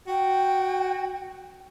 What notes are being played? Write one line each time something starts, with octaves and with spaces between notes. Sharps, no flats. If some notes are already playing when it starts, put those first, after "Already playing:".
F#4 G5